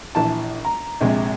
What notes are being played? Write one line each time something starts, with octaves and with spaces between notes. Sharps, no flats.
A#1 E3 A5
A#5
A#1 C3 G#3